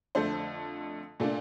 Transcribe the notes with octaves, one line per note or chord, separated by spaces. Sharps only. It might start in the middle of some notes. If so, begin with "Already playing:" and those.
F2 D3 A3 C5
A#2 A3 D4